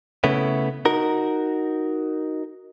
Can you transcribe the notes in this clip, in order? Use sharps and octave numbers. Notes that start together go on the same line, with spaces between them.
C#3 A3 B3 E4
D#4 F#4 A#4